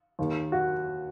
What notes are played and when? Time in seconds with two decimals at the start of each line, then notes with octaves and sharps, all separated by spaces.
0.19 D#2 D#3
0.52 F#4